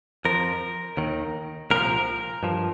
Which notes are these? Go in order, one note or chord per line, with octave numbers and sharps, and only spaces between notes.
F2 F3 A#4
D#2 D#3
C2 A#2 F3 A#4
G2 F3